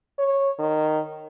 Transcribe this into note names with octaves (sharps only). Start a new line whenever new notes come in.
C#5
D#3